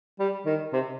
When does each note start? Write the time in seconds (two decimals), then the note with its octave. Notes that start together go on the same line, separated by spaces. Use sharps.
0.19 G3
0.46 D#3
0.73 C3